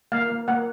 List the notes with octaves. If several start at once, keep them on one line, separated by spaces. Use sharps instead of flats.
A#3 F5
A#3
A#3 F#5